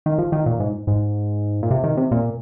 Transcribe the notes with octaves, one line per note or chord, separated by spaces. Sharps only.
D#3
F3
D#3
A#2
G#2
G#2
A#2
C3
D#3
C3
A#2